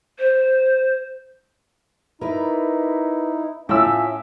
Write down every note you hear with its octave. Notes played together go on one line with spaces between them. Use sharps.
C5
D#4 E4 A#4 B4 D5
A2 C#4 F4 E5 E6